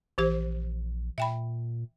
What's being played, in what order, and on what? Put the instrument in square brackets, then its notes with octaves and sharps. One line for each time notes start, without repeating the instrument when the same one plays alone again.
[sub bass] A#1 [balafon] E3 G4 C5
[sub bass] A#2 [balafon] E5 G5 B5